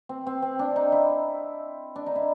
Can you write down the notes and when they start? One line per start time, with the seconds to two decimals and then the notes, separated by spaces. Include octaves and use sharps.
0.09 C4
0.27 C4
0.42 C4
0.59 D4
0.76 D#4
0.92 E4
1.96 D4
2.06 D#4
2.16 E4